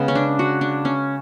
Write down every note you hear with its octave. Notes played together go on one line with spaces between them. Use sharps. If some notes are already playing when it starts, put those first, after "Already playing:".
Already playing: C#3 G#3 B3
C#4
D4
F#4
D4
C#4